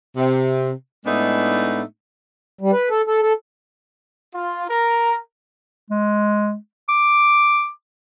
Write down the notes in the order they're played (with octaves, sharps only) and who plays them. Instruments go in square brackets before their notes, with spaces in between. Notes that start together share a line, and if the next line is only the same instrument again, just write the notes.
[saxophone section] C3
A2 G#3 A3 B3 D4 D#4
[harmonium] G3
B4
A4
A4
A4
[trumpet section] F4
A#4 A#5
[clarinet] G#3
D6